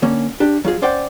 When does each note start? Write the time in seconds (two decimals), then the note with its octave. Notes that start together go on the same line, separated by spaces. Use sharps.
0.02 D3 A#3 C#4 C#5
0.40 D4 G4
0.65 F#3 F4 G#4
0.82 C#4 C5 D5 F#5 G5